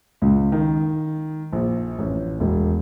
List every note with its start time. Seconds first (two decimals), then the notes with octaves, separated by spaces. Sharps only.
0.22 C#2
0.52 D#3
1.53 A#1
1.99 A1
2.40 E1